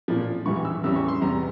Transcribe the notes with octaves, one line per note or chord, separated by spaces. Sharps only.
A#2 F3
G#2 E3 G3 C#6
E6
E2 C#3 E3 G3 E6
C#6
C6
E2 C3 G3 A#5